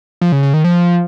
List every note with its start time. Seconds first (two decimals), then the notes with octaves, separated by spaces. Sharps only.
0.21 F3
0.32 C#3
0.43 C#3
0.54 D#3
0.64 F3